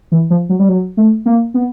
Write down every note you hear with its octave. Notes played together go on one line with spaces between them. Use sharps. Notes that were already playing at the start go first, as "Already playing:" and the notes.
E3
F3
F#3
G3
F#3
A3
A#3
B3